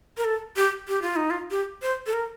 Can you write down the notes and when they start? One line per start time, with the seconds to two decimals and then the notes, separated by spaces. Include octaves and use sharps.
0.17 A#4
0.25 A4
0.56 G4
0.88 G4
1.02 F4
1.16 D#4
1.30 F4
1.51 G4
1.82 C5
2.07 A4
2.13 A#4